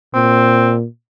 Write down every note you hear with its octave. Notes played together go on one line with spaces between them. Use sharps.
A#2 C4